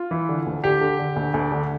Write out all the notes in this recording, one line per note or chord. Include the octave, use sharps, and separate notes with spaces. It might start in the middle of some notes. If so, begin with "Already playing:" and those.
Already playing: F4
E3
D3
D2
D3 G4
D3
D3
D2
D2
D3